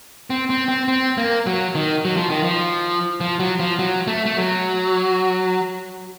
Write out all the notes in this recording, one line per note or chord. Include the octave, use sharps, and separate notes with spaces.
C4
C4
C4
C4
A#3
F#3
D#3
F#3
F3
D#3
F3
F3
F#3
F3
F#3
A3
A3
F#3